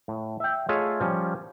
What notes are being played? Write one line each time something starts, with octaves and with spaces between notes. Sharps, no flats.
A2
E5 G5
A3 F4 G#4 C#5 D#5 E5
F3 G3 C#4